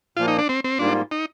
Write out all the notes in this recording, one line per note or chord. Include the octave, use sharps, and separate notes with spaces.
A#2 F3 A#3 F4
D#4
D4
C4
C4
G#2 G3 A#3 D4 F4
D#4